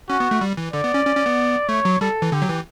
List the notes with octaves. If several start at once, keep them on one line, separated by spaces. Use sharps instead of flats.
C#4 F#4
B3
A3
G3
E3
D3 D5
B3
C#4
C#4
C#4
B3
A3 C#5
F#3
G3 A4
E3
D3 G4
F#3
E3